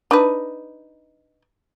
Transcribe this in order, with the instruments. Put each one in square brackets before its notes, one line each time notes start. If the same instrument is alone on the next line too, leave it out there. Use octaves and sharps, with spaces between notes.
[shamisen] D4 D#4 B4